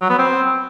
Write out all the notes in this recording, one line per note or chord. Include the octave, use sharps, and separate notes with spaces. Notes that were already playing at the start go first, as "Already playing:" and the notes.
F#3
B3
C4